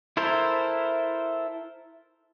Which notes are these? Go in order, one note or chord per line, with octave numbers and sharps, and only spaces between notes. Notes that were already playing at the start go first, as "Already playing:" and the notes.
E4 A4 A#4 C5